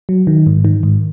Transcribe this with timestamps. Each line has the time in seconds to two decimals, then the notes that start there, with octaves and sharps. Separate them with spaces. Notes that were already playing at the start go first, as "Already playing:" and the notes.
0.09 F#3
0.27 D#3
0.46 G#2
0.65 D#3
0.83 G#2